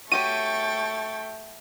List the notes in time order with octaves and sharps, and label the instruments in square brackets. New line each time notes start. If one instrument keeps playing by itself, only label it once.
[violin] A3 [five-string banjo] F#4 G4 C#5 [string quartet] G5 C#6 A6 [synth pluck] D#7